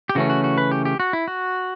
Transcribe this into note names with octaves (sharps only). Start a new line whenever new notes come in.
G4
C#3 E3 A3 C#4 F#4
F#4
F#4
B4
G4
G4
F#4
E4
F#4